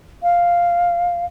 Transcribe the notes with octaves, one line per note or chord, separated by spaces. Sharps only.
F5